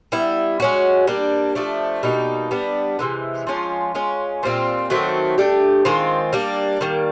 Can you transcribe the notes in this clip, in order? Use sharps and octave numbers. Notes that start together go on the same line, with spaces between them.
G3 B3 E4
G#3 C#4 F#4
G3 A#3 D4
F3 A3 D4
B2 G3 A#3 D#4
G3 B3 D4
C3 E3 G#3
F3 G#3 C#4 F4
G#3 C#4 F4
A#2 G3 C4 F4
D#3 F#3 A3 C4
A3 D4 G4
D#3 G#3 C4 F4
G3 A#3 D4
D#3 G3 A#3